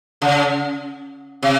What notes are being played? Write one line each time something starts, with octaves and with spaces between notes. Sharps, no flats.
C#3
C3